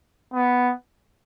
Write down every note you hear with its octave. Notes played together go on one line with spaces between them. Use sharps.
B3